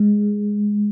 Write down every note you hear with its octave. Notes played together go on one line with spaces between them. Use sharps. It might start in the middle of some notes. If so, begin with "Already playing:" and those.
Already playing: G#3